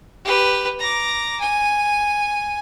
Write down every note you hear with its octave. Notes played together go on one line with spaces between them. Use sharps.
G4 B4
A#5 D6
G#5